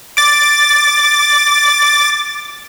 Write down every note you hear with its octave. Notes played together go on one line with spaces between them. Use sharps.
D6 A6